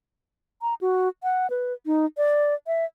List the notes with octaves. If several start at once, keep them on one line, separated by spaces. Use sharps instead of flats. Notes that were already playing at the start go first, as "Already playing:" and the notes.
A#5
F#4
F#5
B4
D#4
D5
E5